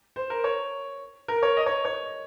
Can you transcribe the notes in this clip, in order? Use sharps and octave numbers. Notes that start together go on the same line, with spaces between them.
C5
A#4
C#5
A#4
C#5
D#5
C#5
C#5